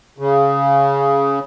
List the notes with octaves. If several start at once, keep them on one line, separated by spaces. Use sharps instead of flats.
C#3